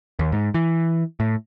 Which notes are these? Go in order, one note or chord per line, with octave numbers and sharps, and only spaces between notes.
D#2
G#2
E3
A2